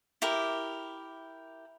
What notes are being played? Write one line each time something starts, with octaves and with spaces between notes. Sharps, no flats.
E4 G4 A#4